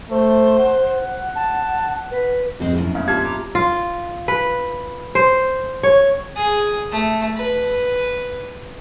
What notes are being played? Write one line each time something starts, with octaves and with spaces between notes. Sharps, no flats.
A3 C5
F#5
A5
B4
F2 G#3 C4 F#4
F#2 B2 E4
A3 A#3 F5
F4 G4 A5 F6 G#6
A#5 D6
F4
B4
C5
C#5
G#4
A3
B4